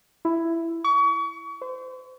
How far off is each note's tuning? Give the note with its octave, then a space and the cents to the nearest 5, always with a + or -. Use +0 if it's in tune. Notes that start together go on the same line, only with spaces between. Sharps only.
E4 +10
C#6 +35
C5 -30